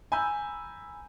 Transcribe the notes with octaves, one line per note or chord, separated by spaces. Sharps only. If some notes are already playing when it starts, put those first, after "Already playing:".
G#5 A#5 B5 E6 G6